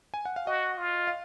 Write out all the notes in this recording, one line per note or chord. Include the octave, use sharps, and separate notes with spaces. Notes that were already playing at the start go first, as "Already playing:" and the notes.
G#5
F#5
F5
F#4 D#5
F4
F5